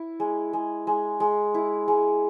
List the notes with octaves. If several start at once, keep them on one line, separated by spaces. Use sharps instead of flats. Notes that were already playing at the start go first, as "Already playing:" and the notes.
Already playing: E4
G#3
G#3
G#3
G#3
E4
G#3